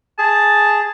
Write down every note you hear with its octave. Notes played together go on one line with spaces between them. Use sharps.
G#4 A5